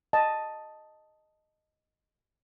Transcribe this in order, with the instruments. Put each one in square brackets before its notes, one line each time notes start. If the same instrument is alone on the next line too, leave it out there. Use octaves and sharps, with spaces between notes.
[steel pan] D#5 A5